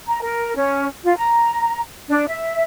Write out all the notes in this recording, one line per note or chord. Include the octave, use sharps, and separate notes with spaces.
A#5
A#4
C#4
F4
A#5
D4
E5